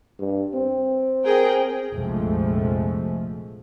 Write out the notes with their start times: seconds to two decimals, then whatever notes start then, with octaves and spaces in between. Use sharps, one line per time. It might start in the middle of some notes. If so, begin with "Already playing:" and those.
0.19 G2
0.54 C4
1.24 G#4 A#4 G5
1.92 A#1 F2 C3 F3 G#3 A3